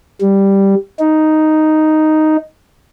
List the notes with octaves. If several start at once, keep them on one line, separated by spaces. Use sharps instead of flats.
G3
D#4